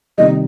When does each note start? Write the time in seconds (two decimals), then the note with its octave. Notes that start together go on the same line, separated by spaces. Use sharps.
0.18 C3 D#3 G3 D#5